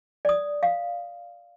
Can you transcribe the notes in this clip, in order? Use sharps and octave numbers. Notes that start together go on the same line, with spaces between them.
D5 D#6
F5